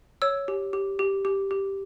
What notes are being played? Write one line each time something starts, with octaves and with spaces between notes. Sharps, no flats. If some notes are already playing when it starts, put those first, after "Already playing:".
C#5 E6
G4
G4
G4
G4
G4